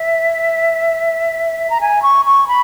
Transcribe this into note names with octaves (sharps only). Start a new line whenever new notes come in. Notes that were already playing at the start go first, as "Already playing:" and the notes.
Already playing: E5
A#5
G#5
C#6
C#6
B5